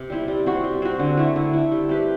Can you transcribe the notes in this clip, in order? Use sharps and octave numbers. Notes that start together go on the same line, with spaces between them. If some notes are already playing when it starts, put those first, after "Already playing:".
Already playing: C3
G3 C4 E4
G3
C4 F#4
G3
C4 F#4
D3
A3 E4
D3
A3 E4
G3
C4 G4 B4